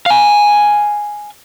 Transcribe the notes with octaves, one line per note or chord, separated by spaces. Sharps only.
F5 G#5